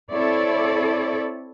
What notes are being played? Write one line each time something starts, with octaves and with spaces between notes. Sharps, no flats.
C4 E4 A4 C#5 D5